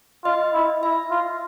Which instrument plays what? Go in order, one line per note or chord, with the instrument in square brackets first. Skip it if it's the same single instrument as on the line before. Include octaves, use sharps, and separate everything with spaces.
[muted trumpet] F4 [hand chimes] D#5
[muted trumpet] E4
[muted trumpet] E4 [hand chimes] E5
[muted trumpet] F4